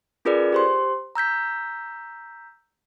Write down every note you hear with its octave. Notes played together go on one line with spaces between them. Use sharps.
C#4 F4 G#4 A#4 B4 D5
G4 C5 C6
A#5 E6 G6 B6